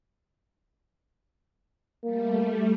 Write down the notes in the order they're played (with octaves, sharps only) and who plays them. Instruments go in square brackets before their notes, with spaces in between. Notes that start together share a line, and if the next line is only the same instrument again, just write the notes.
[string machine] G3 A3 [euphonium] A#3